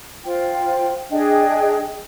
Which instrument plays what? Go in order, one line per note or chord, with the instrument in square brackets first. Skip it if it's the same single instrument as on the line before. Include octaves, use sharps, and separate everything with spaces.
[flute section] F4 C5 G5
D4 G#4 D#5 G5